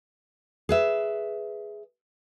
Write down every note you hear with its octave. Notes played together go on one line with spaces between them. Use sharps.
G#4 B4 E5